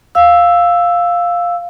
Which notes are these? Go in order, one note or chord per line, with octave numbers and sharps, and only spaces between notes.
F5 E6